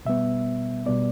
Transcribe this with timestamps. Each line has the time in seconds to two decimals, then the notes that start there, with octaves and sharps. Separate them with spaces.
0.05 B2 G3 B3 E5
0.86 B2 G3 B3 D5